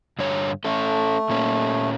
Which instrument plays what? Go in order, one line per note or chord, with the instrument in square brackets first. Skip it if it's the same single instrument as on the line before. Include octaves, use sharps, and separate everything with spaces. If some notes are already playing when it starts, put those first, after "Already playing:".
[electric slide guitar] G2 D3 C#5
[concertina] A3 [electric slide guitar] C#4 A4
[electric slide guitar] A#2 A#3 C#4